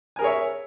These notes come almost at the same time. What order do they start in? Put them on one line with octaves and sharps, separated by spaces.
G#5 A#4 G#4 C#5 E5